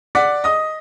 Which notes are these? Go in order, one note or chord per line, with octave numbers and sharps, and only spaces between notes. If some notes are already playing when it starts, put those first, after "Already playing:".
D5 F#5 D6 B6
D#5 D#6